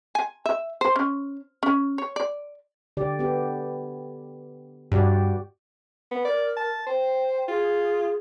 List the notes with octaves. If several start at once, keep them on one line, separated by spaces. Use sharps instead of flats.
G#5
E5
C5
C#4
C#4
C#5
D5
D3 G4 D5
B3 G4
G2 F#4 G4 D5
B3
A#4 D5
A5
C5 G5
F4 G#4